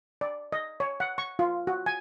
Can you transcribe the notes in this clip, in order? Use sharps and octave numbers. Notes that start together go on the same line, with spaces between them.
D5
D#5
C#5
F#5
C#6
F4
F#4
G#5